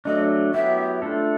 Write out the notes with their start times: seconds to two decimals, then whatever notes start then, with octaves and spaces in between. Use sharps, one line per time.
0.05 F#3 A3 D4 D#5
0.54 F#3 B3 E4 G4 E5
1.02 A3 D4 F4 A4